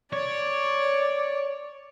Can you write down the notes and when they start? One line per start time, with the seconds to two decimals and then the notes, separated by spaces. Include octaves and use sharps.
0.13 C#5 D5